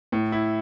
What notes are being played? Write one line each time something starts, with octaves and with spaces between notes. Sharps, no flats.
A2
E4